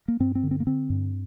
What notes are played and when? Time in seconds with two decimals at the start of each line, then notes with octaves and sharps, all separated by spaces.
0.08 A#3
0.20 G2 C4
0.35 C4
0.43 D3
0.51 C4
0.60 A#3
0.67 D3 C4
0.90 G2